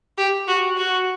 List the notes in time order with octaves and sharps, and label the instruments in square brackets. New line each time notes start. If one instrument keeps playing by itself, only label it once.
[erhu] G4
F#4
F#4